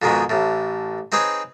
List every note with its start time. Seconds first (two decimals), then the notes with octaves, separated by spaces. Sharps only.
0.02 F2 G#2 B2 D#3 G#3
0.30 A1 A2
1.12 C4 D#4 G#4 B4 C#5